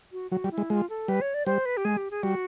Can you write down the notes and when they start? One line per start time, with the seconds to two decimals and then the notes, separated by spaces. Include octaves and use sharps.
0.12 F#4
0.31 F#3 F#4
0.44 G3
0.51 E4
0.58 G#3
0.70 G#3 F4
0.90 A4
1.08 G3 B4
1.21 C#5
1.34 D5
1.46 G3 C5
1.66 B4
1.77 G4
1.85 G#3 G#4
1.97 G4
2.11 G#4
2.23 G3 F#4